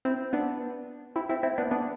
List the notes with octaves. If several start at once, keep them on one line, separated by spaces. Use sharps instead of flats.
C4 E4
B3 D4
C4 E4
C4 E4
C4 E4
B3 D4
B3 D4